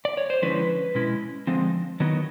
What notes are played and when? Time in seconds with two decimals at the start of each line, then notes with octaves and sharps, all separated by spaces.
0.05 D5
0.17 C#5
0.30 C5
0.42 D3 F3 G#3 C#4 E4 B4
0.95 B2 G#3 C#4 E4
1.47 D3 F3 G#3 C4
2.00 D#3 F#3 B3 D#4